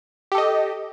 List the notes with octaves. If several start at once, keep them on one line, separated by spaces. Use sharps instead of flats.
G4 A4 D#5